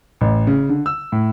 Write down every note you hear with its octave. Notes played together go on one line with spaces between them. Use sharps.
A1
C#3
D3
E6
A2